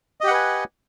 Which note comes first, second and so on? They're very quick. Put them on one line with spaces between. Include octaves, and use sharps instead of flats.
D#5 G4 F#5 B4 G#5